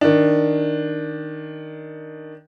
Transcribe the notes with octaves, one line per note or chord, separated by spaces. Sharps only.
D#3 D4